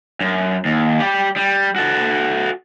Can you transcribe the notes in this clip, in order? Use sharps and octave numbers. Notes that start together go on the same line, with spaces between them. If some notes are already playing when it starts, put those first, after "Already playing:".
F#2
D#2
G4 D5
G3
F#4 A4